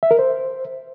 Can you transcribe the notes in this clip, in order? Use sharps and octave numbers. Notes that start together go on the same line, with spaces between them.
E5
A#4
C5